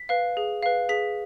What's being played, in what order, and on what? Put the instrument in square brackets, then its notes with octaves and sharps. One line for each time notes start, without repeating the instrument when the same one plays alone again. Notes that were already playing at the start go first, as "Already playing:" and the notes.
Already playing: [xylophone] B6
B4 F5
G#4
B4 F5
G#4 B6